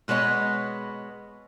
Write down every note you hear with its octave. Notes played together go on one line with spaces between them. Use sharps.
B2 G#3 B3 C#5 D#5